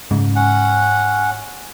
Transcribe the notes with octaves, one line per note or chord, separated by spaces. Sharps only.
G#2 C#3
C#4 F#5